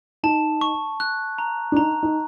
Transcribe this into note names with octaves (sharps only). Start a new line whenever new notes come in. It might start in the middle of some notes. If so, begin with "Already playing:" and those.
D#4 A5
C#6
F#6
A#5
D4
D#4 A#5
D#4